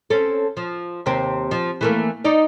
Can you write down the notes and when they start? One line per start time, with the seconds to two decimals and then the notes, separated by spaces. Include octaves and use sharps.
0.10 C4 C#4 A4
0.57 F3
1.06 D#2 C3 C4
1.51 F3
1.81 E3 A3 A#3
2.24 D#4 D5